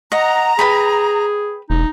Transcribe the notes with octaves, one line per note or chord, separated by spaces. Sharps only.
D#5 F#5 A#5
G#4 B4 G5 B5
E1 D#4